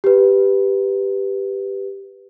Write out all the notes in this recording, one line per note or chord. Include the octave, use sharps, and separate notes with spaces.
G4 B4